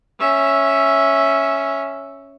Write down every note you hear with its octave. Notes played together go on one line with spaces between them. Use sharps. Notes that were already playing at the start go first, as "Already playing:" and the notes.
C#4 E5